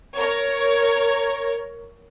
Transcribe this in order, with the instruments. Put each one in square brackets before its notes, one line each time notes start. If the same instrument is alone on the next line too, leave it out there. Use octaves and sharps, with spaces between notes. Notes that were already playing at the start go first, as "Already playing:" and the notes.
[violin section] A#4 C#5